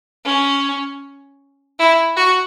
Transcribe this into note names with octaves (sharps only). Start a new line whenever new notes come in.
C#4
E4
F#4